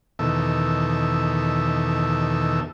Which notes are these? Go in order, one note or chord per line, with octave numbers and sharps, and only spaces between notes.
E2 B2 D#3 A4 E5